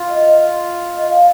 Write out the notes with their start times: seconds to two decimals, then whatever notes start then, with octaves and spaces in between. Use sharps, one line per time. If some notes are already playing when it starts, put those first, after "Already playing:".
Already playing: F4
0.09 D#5
0.98 D#5
1.10 F5